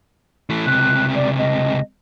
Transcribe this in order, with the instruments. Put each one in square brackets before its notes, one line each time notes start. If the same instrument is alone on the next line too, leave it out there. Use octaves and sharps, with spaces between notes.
[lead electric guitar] E3 A3
[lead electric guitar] C#2 C3 [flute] F#6
[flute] D5
D#5